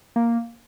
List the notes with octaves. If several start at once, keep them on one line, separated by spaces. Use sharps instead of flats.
A#3